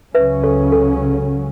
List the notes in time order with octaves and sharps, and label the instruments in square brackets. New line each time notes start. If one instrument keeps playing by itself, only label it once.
[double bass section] C#2 C#3 F#3 C#4 [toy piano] B4 E5
[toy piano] A4 C#5
A4